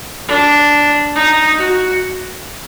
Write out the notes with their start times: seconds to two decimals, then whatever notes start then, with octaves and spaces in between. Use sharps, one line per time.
0.28 D4
1.15 D#4
1.58 F#4